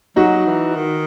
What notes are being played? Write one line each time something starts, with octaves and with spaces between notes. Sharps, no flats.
F#3 D#4 F#4
E3
D#3